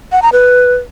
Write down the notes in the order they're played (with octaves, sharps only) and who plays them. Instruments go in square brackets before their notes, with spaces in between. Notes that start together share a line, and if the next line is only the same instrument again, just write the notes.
[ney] F#5
A#5
B4